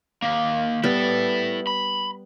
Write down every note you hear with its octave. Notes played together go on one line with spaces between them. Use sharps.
D#2 A#3
G3 B3 E4 A4
B5